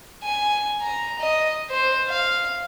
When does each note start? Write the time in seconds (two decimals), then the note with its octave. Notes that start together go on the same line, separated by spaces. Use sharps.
0.23 G#5
0.81 A#5
1.19 D#5
1.70 C5
2.08 F5